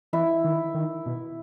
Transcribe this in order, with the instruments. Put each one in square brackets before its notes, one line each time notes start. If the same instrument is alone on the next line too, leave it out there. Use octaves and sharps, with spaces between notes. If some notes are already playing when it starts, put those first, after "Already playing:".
[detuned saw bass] E3 [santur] E4
[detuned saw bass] D#3
D#3
B2